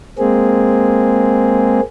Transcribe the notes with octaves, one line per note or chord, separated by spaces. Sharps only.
G#3 A#3 C4 G#4